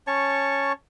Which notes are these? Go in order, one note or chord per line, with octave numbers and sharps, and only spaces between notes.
C#4 C#5 A5 C#6